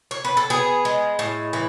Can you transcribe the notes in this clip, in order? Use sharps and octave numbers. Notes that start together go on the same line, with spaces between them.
C#5
B4
A4
B3 G#4
G#3
A2
E3